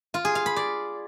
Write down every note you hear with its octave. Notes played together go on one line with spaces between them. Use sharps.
F4
G#4
F5
B5
D5